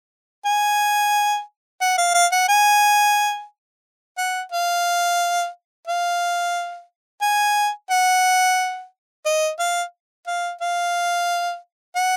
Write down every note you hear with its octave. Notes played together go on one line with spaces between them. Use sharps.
G#5
F#5
F5
F5
F#5
G#5
F#5
F5
F5
G#5
F#5
D#5
F5
F5
F5
F#5